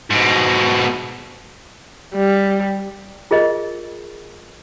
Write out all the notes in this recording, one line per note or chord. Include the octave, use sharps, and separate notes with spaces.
G#2 B2
G3
F4 G#4 A#4 D#5